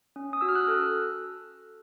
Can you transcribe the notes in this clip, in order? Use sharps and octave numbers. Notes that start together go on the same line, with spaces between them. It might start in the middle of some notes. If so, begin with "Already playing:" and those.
C#4
D#6
F#4 E6
F6
E6 F#6
A4